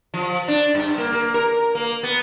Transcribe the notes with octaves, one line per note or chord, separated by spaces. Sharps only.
F3
D4
G2
A#3
A#3
A#4
A#3
B3